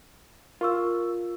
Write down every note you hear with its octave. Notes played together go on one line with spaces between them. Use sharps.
F4 A#4 C#6 E6